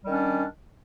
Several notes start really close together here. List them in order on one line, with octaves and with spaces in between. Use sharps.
G3 D#3 C#4 D4